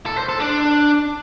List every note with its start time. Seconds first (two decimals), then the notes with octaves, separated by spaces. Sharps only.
0.06 A4
0.17 C5
0.29 A4
0.40 D4